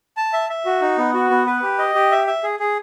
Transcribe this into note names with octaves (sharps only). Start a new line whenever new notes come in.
A5
E5
E5
F#4
D#4
B3
F#4
B3
B4
G4
D#5
G4
E5
E5
G#4
G#4